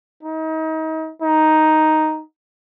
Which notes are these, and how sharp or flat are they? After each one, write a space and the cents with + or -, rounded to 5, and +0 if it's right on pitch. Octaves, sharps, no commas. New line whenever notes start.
D#4 +35
D#4 +5